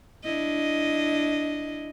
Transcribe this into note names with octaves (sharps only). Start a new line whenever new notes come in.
D4 E4 D#5